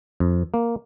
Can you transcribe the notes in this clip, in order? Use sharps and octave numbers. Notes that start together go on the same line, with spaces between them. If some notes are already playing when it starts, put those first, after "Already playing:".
F2
A#3